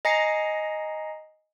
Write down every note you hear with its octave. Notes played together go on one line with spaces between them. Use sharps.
D#5 G#5 A#5 A#6 C7 C#7